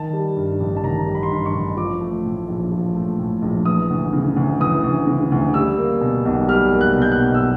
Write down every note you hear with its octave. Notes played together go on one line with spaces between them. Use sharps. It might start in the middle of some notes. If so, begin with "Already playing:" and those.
Already playing: D#3 A5
G3
G2
A1
A5
D#3 A#5
G3
B5
C6
G2 B5
C#6
A1
F3 D6
A3
A2
A#1
F3
A3
A2
A#1
E3 D#6
D2
C#3
D2
E3 D#6
D2
C#3
D2
G3 E6
A#3
B2
B1
G3 F6
A#3
F#6
B2
G6
F#6
B1
E6